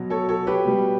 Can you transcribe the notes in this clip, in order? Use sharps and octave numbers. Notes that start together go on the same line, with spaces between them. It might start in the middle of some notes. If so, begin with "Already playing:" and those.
Already playing: B2 F#3
A4 C#5
A4 C#5
G4 B4
B2 G3